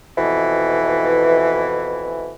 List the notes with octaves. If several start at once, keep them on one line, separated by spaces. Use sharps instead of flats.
F2 B2 E3